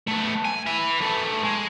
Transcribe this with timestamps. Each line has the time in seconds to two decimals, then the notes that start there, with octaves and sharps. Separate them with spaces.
0.08 A3 B3
0.45 G#5
0.67 B4 E5
1.02 A3 B3
1.44 G#3